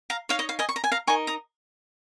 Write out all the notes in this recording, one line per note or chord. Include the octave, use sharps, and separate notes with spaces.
F5 A#5
D#4 C#5 F5
D#5
F5
D#5 G#5
C#6
A#5
G#5
F5 A#5
D#4 A#4 D#5 G#5 C#6
A#5 D#6